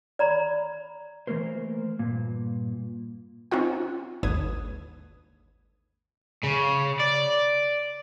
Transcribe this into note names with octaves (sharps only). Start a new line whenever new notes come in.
D5 A#5 B5
E3 A3 A#3 A#4 C5
G2 A#2
C4 C#4 D#4 F4 F#5
G#1 D#2 D3 B4 D#6 G#6
C#3
D5